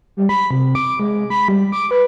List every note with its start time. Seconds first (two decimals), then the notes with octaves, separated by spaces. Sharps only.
0.17 G3
0.29 B5
0.51 C3
0.75 D6
0.99 G#3
1.30 B5
1.48 G3
1.72 D6
1.91 B4